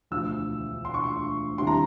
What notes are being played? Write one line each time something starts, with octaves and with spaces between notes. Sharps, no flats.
E1 D2 D3 F3 E6
C6
C#6
C6
D#2 D3 G3 C4 E4 C6
A#5